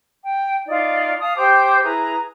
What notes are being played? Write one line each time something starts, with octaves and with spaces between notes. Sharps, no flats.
G5
D#4 F4 D5
F5 A5 D#6
G4 C5 G5 D6
E4 G#4 B4 A#5